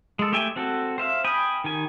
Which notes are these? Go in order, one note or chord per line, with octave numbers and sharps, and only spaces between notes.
G#3 A4
A3 G4 E5 G5 G#5
C4 F#4 A4
C5 E5 F5
G5 G#5 B5 D#6
D#3 G4 G#5